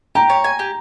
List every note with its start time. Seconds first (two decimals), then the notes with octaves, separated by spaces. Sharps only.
0.15 G4 A#5
0.30 C#5
0.44 G#5
0.59 G4